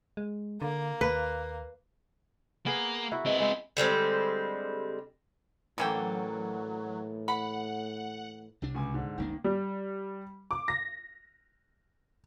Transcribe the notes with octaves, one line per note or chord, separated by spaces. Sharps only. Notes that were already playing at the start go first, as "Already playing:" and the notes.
G#3
D3 A#3
D#2 B4
A#3 B3 G#4 A#4
E4 F#4
G#3 C4 B4
G#3 C5 E5
D3 G3 G#3 C4
A2 D3 E3 F#3 A#3 C#4 A4 G5
F#5 B5
C2 C3 D4
C#2 G#5 D6
G#2 D3
F#1 C#2 D#3 A#3 D4
G3
D6
A#6